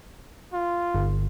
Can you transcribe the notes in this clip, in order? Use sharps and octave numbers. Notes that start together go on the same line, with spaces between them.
F4
G1